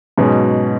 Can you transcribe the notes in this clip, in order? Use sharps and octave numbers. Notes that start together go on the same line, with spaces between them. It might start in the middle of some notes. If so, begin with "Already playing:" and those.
G#2 B2 F#3 C#4 G#4